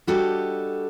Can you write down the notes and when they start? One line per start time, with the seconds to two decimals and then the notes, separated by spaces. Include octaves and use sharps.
0.07 G3 D4 F#4 G4 A4 D#5